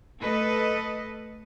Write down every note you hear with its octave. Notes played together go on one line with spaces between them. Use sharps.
A3 A4 B4 D#5